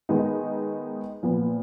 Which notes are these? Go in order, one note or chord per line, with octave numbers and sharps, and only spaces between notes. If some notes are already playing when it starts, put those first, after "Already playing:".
D#3 G#3 B3 D#4
A#2 F3 B3